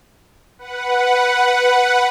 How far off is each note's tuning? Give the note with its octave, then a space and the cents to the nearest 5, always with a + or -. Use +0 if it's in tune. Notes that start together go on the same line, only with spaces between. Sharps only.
B4 +0 F#5 +0